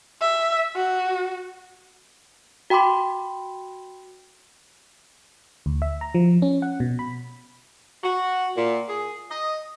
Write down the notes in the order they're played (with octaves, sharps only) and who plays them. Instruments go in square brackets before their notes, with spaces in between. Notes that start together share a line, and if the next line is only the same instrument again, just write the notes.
[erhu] E5
F#4
[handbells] F#4 G5 B5 C6 D6
[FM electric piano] D2
E5
A#5
F3
C#4
F#5
B2
B5
[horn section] F#4
A#2
G#4
D#5